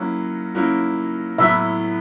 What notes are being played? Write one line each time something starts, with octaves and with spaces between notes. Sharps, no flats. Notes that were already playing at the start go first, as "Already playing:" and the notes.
Already playing: F#3 A#3 C#4 E4
F#3 A#3 C#4 E4
A2 F#3 B3 E4 E5